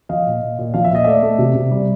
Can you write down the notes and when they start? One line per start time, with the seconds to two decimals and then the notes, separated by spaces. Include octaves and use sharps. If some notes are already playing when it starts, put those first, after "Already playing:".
0.09 F3 D#5 F5
0.26 A#2
0.42 A#2
0.58 A#2
0.74 F3 F5
0.85 E5
0.90 A#2 D#5
1.04 A3 D5 E5
1.22 A3
1.38 C3
1.55 C3
1.71 G3